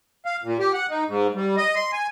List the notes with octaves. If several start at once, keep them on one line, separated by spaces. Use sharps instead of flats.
F5
A#2
G4
F#5
D#4
G#2
G3
D#5
C6
G#5